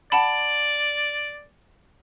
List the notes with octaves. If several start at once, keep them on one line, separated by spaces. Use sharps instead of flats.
D5 F#5 A5 B5